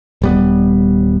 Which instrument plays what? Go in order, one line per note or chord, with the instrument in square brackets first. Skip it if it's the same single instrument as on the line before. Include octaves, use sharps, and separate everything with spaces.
[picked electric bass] D#1 G3 B3